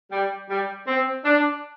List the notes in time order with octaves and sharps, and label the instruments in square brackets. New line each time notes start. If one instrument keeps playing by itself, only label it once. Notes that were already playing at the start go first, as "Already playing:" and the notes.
[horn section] G3
G3
C4
D4